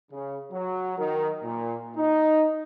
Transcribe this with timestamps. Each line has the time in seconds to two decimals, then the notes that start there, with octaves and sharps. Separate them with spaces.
0.11 C#3
0.52 F#3
0.98 D#3
1.43 A#2
1.96 D#4